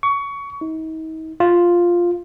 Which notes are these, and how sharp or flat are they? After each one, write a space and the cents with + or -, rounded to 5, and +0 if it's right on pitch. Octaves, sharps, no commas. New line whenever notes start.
C#6 +20
D#4 +40
F4 +0